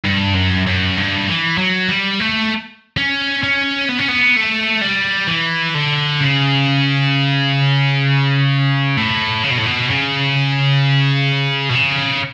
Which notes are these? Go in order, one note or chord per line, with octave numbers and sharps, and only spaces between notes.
G2
F#2
F#2
G2
E3
F#3
G3
A3
C#4
C#4
B3
C#4
B3
A3
G3
E3
D3
C#3
A2
C#3
B2
A2
B2
C#3
B2
C#3